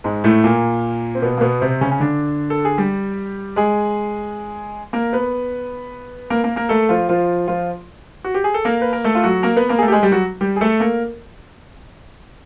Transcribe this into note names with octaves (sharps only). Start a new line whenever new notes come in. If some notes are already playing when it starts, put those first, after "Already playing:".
G#2 G#3
A2 A3
A#2 A#3
C4
B2 B3
A#3
B2 B3
C3 C4
C#3 C#4
C#4
D3 D4
A4
G#4
G3 G4
G#3 G#4
A#3 A#4
B3 B4
A#3 A#4
A#3 A#4
A#3 A#4
A3 A4
F3 F4
F3 F4
F3 F4
F#4
G4
G#4
A4
A#3 A#4
B4
A#4
A3 A4
F4
F#3 F#4
A#3 A#4
B3 B4
A#3 A#4
G#4
A3 A4
G4
G#3 G#4
G3 G4
F#3 F#4
G3 G4
G#4
A3 A4
A#3 A#4